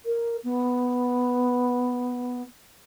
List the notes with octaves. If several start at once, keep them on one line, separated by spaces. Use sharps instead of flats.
A#4
B3